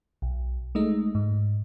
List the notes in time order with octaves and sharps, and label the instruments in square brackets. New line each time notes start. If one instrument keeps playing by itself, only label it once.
[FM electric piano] B1
G#3 A3 D#4
G#2